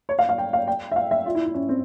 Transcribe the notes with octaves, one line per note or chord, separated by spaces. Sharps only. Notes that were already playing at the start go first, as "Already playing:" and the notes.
C#5
F5
F5
G5
F5
G5
E5
F5
E5
F4
E4
E4
C#4
C4